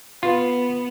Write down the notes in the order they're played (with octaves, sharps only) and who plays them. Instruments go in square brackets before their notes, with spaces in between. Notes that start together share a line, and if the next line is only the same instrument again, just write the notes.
[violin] B3 [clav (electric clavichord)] F4